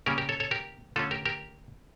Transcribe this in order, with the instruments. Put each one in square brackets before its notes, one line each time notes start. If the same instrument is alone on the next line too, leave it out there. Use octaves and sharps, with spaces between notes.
[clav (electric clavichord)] C#3 G3 A#3 C#4 G4 A#4
G4 A#4
A4 C#5
A4 C#5
G4 A#4
D3 A3 C#4 F4 A4
G4 A#4
G4 A#4